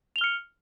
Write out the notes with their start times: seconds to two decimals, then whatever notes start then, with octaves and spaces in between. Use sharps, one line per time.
0.16 F7
0.18 G7
0.21 F6
0.24 C#7